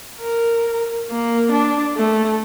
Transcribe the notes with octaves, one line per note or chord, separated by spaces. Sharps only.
A#4
A#3
D4
A3